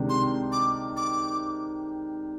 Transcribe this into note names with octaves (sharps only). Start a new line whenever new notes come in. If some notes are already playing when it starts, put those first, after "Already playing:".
Already playing: C3 D#3 G#3 D4
C6
D6
D6